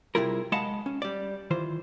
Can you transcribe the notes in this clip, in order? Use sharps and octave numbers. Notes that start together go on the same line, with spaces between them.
C3 G3 E4 F4 G#4 A#4
G#3 D#5 F5 F#5 A5 B5
C#4
G3 D5
D#3 E3 F4 C5